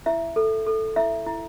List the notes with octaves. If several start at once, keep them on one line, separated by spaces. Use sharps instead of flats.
E4 E5
A4
A4
E4 E5
E4